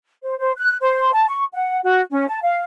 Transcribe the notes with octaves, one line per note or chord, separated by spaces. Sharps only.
C5
C5
F#6
C5
A5
C#6
F#5
F#4
C#4
A5
F5